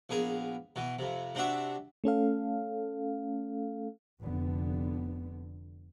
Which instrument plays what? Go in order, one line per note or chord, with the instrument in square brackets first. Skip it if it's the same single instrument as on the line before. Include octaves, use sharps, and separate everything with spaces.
[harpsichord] A#1 B3 G#4 A#4
B2 E3
F2 C3
C3 C4 D4 F#4 E5
[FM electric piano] A3 C#4 A4 F5
[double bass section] F1 D3 B3